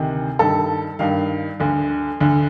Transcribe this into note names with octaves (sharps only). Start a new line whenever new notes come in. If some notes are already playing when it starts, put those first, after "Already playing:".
Already playing: D2 C3 D#3
G2 D#3 A4
G2 D#3 F5
D2 D3
D2 D3